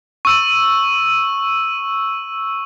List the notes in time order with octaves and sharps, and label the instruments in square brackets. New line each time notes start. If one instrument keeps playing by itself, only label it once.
[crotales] C#6 E6 D#7